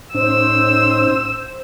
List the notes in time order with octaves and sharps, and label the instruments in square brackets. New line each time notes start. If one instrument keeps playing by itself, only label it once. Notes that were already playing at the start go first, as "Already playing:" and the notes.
[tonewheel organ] A2 C#4 D#4 [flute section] C5 [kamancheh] E6